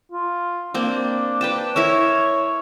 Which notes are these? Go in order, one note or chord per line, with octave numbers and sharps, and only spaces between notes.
F4
A#3 C4 D4
B4 G5 A5
E4 A#4 C#5 E5